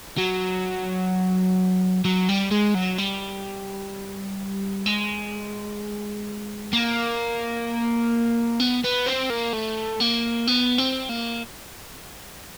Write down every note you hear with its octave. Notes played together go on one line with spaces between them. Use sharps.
F#3
F#3
G3
G#3
F#3
G3
G#3
A#3
B3
B3
C4
A#3
A3
A#3
B3
C4
A#3